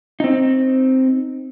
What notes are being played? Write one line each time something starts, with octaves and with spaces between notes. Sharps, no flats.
C4 D#4